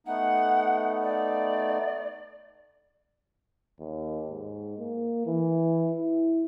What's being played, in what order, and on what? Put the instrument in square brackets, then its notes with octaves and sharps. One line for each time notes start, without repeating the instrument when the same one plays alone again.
[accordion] A3 B3 D#4 [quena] F#5
[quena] D5
[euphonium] D#2
G#2
A#3
E3
E4